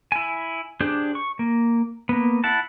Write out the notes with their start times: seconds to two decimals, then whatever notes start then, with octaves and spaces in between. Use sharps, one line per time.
0.12 E4 G#5
0.80 D4 G4 G#4 C5
1.15 C#6
1.39 A#3
2.09 A#3 B3
2.44 E4 F#5 A5